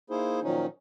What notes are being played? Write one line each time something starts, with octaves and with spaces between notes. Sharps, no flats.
A#3 D#4 E4 G#4 C5
A#2 D#3 F3 F#3 C#4 D#4